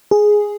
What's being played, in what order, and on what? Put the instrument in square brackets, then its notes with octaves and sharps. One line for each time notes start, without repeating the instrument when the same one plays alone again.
[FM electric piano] G#4